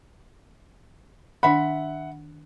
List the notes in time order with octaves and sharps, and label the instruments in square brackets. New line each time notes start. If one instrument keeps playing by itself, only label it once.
[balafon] D#3 D4 [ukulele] E5 B5 [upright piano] F#5